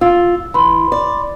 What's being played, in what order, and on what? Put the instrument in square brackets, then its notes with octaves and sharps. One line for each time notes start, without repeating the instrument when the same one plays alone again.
[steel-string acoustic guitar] F4 [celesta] E6
[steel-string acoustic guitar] E3 [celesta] B5 C6
[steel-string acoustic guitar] D5